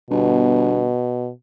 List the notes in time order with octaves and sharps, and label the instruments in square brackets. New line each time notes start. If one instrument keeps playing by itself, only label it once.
[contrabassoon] G1 [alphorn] B2